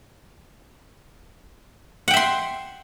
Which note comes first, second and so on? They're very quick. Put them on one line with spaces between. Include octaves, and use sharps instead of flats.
F#5 G5 E5 C6